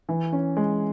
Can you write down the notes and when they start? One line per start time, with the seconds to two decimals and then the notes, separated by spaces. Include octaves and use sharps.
0.09 E3
0.32 C#4
0.57 G#3